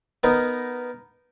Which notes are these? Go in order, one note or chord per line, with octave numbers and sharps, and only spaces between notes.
B3 D#4 A#4